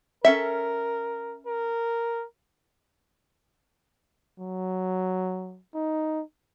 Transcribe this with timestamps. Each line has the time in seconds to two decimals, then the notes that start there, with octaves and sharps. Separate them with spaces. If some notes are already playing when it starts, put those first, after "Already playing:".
0.25 C#4 A4 A#4 E5
1.47 A#4
4.40 F#3
5.74 D#4